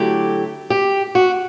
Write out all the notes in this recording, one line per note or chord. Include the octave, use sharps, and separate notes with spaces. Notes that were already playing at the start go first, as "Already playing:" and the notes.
Already playing: D3 F#3 A3 E4 G4
G4
F#4